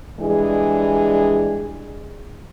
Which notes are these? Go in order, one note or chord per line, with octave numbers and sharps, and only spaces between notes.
E3 G3 G#3 D4 G#4